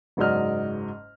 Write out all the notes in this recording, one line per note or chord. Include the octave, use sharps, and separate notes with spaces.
F#1 G#2 F#3 D5 D#5 F6